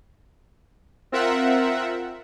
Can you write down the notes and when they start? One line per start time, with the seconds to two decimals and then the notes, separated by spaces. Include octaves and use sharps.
1.12 C4 F4 A#4 E5 F#5